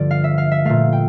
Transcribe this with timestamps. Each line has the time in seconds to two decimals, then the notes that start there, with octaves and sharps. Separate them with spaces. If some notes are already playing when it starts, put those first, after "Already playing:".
Already playing: G2 D3 F3 D5
0.11 F5
0.24 E5
0.38 F5
0.51 E5
0.65 A#2 A3 F5
0.92 G5